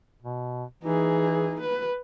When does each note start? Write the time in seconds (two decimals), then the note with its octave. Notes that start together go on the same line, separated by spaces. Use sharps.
0.22 B2
0.83 E3 D#4 G#4
1.61 B4